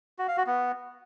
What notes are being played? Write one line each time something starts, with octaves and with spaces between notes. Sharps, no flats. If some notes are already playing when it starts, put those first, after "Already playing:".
F#4
F5
F#4
B3